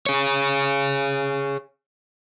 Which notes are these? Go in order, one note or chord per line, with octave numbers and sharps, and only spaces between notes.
G#4 C#5